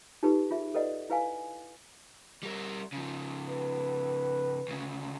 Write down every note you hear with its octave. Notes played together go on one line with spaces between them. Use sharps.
D#4 F4 G4 A4 B4
F4 G#4 E5
A4 B4 D5 D#5 F#5
E4 B4 F5 G#5
G3 A#4
C#3 F3
B4
D2 C#3